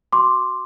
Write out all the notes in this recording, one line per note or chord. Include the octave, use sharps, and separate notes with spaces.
F#4 C6 D6